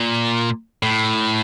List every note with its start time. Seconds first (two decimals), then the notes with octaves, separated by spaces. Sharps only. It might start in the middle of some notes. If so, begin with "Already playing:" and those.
Already playing: A#2
0.83 A2